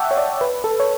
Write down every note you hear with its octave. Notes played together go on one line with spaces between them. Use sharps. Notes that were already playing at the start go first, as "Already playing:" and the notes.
Already playing: E5 F#5 G5 A5 C#6 D6 E6
C#5
D5
B4
A4
C#5